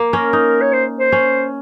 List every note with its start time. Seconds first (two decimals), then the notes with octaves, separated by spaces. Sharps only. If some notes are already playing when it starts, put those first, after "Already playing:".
Already playing: A#3
0.13 C#4 A#4
0.33 D#4
0.61 C#5
0.73 C5
0.99 C5
1.12 C#4